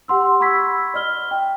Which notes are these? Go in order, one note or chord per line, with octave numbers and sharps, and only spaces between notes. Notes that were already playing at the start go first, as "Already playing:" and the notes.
G4 F#5 C6 E6
F#5 B5 C#6 E6 G#6 B6
D5 D#5 F6 G7
G5